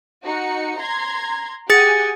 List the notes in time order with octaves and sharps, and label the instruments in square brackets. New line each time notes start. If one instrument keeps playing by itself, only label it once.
[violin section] D#4 F#4 C#7
A#5 C6 G#6
[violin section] G4 F#5 G#5 [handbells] G#4 A6 C#7